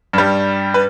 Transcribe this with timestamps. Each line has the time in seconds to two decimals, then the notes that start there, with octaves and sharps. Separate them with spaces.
0.13 G2 G3
0.74 B4